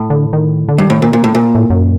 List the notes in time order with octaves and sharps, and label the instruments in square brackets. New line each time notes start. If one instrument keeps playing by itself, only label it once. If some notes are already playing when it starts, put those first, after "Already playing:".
Already playing: [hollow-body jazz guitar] A2
[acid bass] D3
D#3
D3
[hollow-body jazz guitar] G2 [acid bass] D#3
[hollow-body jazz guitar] A2
A#2
A#2
A2
A#2
[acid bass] A2
F#2